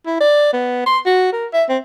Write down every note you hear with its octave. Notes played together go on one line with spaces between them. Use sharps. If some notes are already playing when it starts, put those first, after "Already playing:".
E4
D5
B3
C6
F#4
A#4
E5
C4